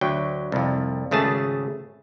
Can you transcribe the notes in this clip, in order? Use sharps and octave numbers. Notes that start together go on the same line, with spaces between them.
D2 F#3 G5
C2 F2
G#1 C#3 A3 G#4 A5